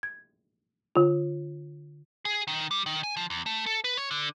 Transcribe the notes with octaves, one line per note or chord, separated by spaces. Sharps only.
G#6
D3 F4
G#4
D#3
G3
D#3
G#5
F3
E2
A3
A4
B4
C#5
D3